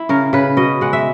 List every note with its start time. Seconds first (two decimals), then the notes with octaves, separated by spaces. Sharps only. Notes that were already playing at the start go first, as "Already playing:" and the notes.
Already playing: E4
0.09 C#3 A#4
0.33 C#3 B4
0.57 B2 D#5
0.81 G#3 F#5
0.93 E5